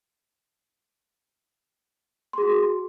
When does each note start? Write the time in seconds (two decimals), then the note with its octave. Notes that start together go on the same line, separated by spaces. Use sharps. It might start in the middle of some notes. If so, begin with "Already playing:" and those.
2.33 C6
2.38 G#4
2.42 F#4